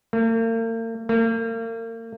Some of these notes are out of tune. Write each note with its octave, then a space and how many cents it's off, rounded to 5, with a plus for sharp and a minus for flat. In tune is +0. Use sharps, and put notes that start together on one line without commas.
A#3 -45
A#3 -40